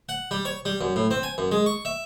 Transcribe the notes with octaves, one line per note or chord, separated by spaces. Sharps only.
F#5
G3
C#5
G3
F#2
A2
C4
G#5
F#2
G#3
C#6
E5